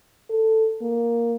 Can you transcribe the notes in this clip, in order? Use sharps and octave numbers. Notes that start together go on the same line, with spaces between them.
A4
A#3